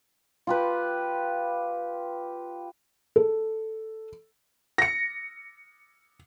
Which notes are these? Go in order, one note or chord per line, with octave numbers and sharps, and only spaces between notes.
F4 G4 B4
A4
A#6 C#7